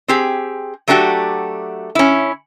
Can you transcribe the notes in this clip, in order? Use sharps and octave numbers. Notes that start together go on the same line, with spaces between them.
C4 G4 G#4
F#3 A3 D4 F#4 G4
C#4 E4